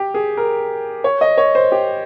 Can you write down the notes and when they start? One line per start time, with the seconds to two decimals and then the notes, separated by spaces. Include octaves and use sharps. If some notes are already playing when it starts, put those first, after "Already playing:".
Already playing: G4
0.14 G#4
0.37 A#4
1.04 C#5
1.21 D#5
1.38 C#5
1.55 C5
1.72 G4